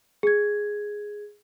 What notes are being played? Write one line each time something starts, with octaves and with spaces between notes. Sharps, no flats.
G#4 G#6